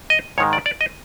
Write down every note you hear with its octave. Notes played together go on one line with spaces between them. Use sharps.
D#5
G#2 D#3 G#3 C#5
D5
D5
D#5